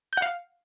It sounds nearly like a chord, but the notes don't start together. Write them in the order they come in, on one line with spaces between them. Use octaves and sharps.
G6 F#5 F5